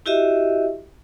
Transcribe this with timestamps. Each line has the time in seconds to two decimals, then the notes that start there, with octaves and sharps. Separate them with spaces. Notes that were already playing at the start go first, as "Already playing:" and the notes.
0.06 E4 F#4 G4 D#5 E5